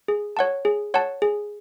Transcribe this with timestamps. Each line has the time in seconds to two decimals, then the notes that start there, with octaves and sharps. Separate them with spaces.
0.08 G#4
0.37 C#5 F#5 A5
0.65 G#4
0.94 C#5 F#5 A5
1.22 G#4